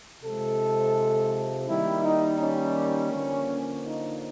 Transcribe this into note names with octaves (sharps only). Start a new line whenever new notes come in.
C3 F3 G#3 A4
D#3 G3 A#3 E4
D#4
C#4
D3 F3 A#3
D#4